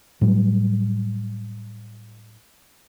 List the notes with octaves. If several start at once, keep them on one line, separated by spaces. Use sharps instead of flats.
A2 F#3 G3